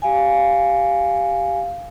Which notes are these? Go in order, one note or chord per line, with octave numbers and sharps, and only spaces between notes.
G4 F5 G#5